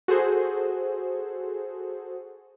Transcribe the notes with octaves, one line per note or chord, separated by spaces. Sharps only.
F#4 G#4 A4 C5